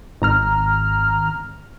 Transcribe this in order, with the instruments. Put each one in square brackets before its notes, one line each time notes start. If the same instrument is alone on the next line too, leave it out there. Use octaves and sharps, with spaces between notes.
[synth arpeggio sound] G#1 A#5 F6